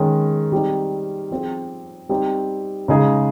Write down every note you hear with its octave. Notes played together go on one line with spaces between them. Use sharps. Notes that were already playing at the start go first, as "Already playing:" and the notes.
Already playing: D#3 G#3 C#4
G3 C4 D#4
F3 C4 F4 G#4
G3 C4 D#4
C#3 G#3 D#4 G#4